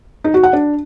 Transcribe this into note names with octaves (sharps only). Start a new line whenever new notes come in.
D#4
F#4
F#5
D4